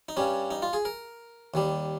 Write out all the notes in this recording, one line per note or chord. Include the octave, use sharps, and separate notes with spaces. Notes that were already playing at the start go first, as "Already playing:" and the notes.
D#4
G2 G3 C#4
D#4
F4
G#4
A#4
D#2 D#3 G3